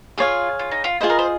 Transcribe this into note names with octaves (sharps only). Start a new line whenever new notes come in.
F4 G#4 C#5 F5
F4
D#4
F4
F4 G#4 C5 D#5
A#4
C5